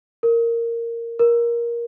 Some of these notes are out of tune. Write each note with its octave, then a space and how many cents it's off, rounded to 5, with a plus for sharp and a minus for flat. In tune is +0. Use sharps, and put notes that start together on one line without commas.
A#4 -10
A#4 +15